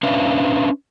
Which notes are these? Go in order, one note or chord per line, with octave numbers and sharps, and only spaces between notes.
C#4 D4 B4 C5 E5 F5